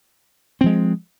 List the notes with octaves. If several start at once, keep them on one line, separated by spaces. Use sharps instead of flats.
F3 G#3 C4